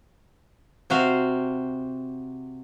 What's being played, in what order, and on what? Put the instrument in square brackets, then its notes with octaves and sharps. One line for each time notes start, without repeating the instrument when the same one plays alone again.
[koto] C3 F#4 C5 F5